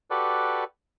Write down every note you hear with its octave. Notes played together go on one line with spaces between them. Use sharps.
F#4 G4 A4 B4 D5